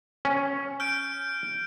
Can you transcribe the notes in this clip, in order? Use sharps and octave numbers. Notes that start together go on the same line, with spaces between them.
C#4
F6 G6 D7